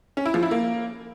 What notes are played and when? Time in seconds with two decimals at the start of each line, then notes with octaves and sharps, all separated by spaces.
0.17 C#4
0.26 E4
0.34 F3
0.43 E4
0.51 A#3